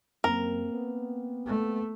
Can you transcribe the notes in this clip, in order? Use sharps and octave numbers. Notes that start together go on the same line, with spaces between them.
F#2 A#3 C4 A#4
B3
A3